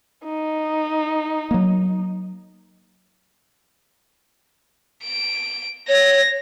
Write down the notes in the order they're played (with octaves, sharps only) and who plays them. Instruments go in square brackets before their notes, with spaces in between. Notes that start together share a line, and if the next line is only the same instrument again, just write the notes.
[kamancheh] D#4
[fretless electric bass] F#3 A#3
[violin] D7
[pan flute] C#5 [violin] A#6